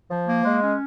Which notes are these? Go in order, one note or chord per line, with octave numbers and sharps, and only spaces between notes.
F3
A#3
G#3
C#4